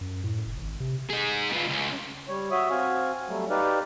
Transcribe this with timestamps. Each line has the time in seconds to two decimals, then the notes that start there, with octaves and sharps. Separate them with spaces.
0.01 F#2
0.24 A2
0.46 F1
0.58 G#1
0.80 C3
1.10 D#4 G#4
1.53 B3 F4
1.69 C#2
2.28 G3 C#5
2.51 F#4 C#5 E5 D#6
2.70 C4 F#4 F5 G#5
3.28 F#3 G3 A3
3.50 D#4 G4 B4 D5 F5